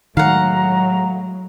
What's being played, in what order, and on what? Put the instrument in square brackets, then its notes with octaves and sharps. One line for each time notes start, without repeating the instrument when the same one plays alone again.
[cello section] A2 F#3 G#3 [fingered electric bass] D#3 [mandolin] F5 F#5 [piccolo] A#5